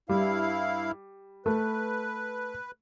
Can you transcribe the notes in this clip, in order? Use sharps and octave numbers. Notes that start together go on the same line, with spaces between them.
G2 G3 E4 F5
A3 B4